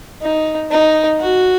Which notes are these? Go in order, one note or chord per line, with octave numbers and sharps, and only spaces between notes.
D#4
D#4
F#4